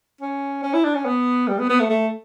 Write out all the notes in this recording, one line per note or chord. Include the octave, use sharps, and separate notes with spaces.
C#4
C#4
E4
D4
C#4
B3
G3
B3
B3
A3
A3